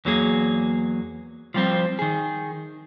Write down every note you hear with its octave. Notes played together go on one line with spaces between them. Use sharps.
E2 F#3 A#3 G#4
F3 G3 C4
D#3 G#4